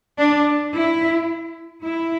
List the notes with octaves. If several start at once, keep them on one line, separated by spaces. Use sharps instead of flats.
D4
E4
E4